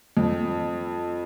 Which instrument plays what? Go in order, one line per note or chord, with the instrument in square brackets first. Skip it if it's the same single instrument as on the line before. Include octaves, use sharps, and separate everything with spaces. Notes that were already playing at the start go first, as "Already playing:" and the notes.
[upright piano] F2